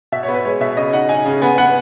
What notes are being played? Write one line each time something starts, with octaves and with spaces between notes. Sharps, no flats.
B2 E5
C#5
B3
B4
G#3 C#5
B2 E5
C#3 D#5
D#4 F#5
D#4 G#5
C#3
B3 G#5
B3 F#5